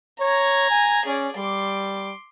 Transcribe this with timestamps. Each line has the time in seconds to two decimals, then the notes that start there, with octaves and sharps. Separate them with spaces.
0.21 C#5 A#5 G#6
0.70 G#5
1.06 C#4 G#4 D5
1.37 G3 C6 D6